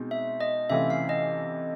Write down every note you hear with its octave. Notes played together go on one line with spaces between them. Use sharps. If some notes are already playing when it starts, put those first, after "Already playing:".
Already playing: B2 G#3 C4 D#4
E5
D#5
C3 E3 A3 C#4 F4 E5
F5
D#5